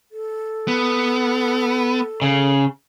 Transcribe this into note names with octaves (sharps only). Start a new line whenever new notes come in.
A4
B3
C#3